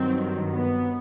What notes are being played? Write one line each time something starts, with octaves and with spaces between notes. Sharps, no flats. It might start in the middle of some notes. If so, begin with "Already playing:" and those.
Already playing: G2 D#3 F#3 C4
B3